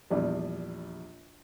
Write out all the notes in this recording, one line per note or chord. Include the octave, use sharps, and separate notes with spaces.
A#1 E2 G3 D5